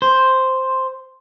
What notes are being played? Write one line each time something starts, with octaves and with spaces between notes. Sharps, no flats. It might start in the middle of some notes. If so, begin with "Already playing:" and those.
C5